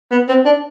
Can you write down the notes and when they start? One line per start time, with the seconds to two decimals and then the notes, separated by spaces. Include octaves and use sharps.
0.11 B3
0.28 C4
0.45 D4